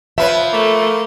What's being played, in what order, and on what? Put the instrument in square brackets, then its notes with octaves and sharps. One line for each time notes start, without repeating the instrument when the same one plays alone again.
[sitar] F3 B4 [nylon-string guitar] C#5 E5
[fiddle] A3 [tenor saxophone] A#3